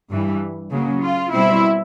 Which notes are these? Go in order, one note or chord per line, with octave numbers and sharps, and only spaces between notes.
G2 E3 G3
C#3 F#3 A#3
F4
B2 G3 C4 E4